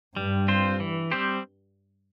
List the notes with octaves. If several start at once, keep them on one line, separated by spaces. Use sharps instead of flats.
G2 G3
C4 F4 C5
E3
G3 C4 G4 C5